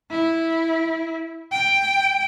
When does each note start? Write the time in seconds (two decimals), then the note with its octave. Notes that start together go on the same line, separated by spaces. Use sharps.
0.10 E4
1.52 G5